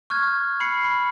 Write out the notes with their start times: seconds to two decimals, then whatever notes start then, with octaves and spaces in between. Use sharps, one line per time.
0.10 C#6 F6 F#6 G#6
0.60 B5 C7 C#7
0.84 B5